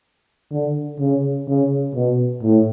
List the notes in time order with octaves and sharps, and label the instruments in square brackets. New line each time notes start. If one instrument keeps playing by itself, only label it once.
[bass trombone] D3
C#3
C#3
B2
A2